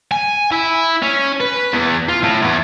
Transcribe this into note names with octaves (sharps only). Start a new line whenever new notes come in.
G#5
E4
C#4
B4
E2
F4
A2
E2